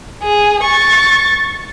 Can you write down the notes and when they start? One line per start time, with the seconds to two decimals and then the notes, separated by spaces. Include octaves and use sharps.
0.23 G#4
0.63 C#6 A6